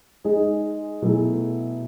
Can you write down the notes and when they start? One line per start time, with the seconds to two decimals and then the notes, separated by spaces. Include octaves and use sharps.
0.24 G#3 D#4 G#4 D#5
1.02 B2 F#3 A3 E4 G#4